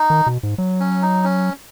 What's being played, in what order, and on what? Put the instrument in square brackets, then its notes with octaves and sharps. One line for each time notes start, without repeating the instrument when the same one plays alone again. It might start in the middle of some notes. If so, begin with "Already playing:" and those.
Already playing: [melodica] D#4
[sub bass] D#3
B2
G#2
F#3
[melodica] C#4
D#4
C#4